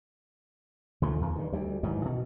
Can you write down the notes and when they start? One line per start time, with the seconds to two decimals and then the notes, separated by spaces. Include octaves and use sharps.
1.02 D2 C#3 F3 A3
1.21 E2 D#3
1.36 G2 D#3
1.52 D2 G3
1.83 G#2 D#3 E3 F#3
2.05 B2